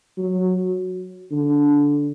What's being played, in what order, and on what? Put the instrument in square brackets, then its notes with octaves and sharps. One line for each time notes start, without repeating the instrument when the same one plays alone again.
[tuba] F#3
D3